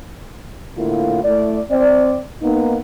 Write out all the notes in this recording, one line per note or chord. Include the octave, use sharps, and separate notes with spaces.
A2 D3 A#3 E4 F4
A3 E4 D5
C4 D5
A#3 B3 D#4